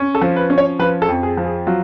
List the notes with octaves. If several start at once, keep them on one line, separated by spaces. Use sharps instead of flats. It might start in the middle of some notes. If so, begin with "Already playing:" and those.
Already playing: C#4
A4
F3
B4
C#4
C#5
F3 B4
A4
F2
G#4
F3
G#4
F#3 F4